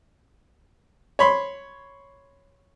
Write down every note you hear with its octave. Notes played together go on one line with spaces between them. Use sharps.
C#5 B5 C6